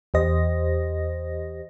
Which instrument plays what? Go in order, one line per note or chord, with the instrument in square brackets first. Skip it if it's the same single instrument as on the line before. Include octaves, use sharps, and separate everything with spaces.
[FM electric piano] E2 G4 C5 D#5 A#6